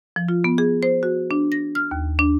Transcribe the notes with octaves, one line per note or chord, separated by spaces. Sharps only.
F3
F4
B3
G#4
C5
F#4
D4
A#6
F6
D#2
D4